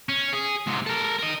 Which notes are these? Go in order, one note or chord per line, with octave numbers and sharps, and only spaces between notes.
C#4
G#4
G#2 C3
A4 A#4
A#4 D#5